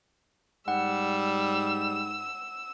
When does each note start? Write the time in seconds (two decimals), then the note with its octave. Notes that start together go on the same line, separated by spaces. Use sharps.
0.68 G#2 G3 F#5 E6